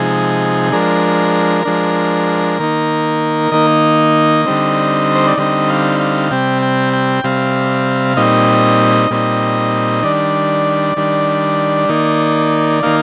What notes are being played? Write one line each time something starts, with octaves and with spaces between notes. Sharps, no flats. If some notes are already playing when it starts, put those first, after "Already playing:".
Already playing: C3 F3 G#3 D#4 G#4
F3 G#3 D4 A#4
F3 G#3 D4
D#3 A#3 D#4
D#3 A#3 D#4 D#5
D3 G3 C4 D#4
C5
D5
D3 G3 C4 D#4 D#5
F5
F5
C3 G3 C4 G5
G5
G5
C3 G3 C4 F5
A#2 G3 C4 D#4 D#5
A#2 G3 C4 D#4
D#3 G3 D4 D5
D#3 G3 D4
D#3 A#3 D#4
D#3 A#3 D#4 F5